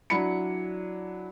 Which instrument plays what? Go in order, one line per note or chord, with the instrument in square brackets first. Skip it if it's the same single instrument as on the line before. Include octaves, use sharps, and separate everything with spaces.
[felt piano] F#3 D4 E4 B5 C#7